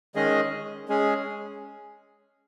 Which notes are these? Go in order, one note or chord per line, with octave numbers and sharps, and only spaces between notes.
D#3 G#3 C#4 G#4 D#5
G#3 C#4 G#4